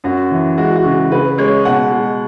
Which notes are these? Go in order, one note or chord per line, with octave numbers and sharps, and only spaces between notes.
F#2 F#4
E3
G#3 F#4
F#4
C#3
C#3 B4
G#3 C#5
B2 F#5
G#3